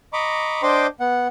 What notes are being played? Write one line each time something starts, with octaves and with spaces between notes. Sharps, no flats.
D#5 A#5 B5 C#6 D6
D4 C5 D#5 G5 C6 D6
B3 F#5